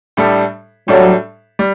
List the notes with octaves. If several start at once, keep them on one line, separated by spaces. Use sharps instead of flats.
A2 G3 D4 A4
A2 F#3 G3 D4 A4
G3